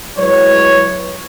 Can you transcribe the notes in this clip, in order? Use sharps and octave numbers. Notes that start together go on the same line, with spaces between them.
F#3 G#3 E4 B4 C#5